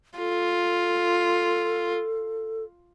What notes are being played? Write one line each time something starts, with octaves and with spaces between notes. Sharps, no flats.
F4 A4